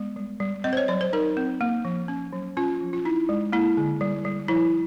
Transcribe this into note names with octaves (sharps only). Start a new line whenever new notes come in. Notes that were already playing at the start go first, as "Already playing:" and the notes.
Already playing: G#3 B3
G3
G3
C4 D#5
C5
C#5
F#3 D5
C5
D#4 A#4
C4
A#3
F3
C#4
F#3
C#4 F4
F3
F4
D#4 E4
G#3
A#3 E4
D3
G3
G3
F3 E4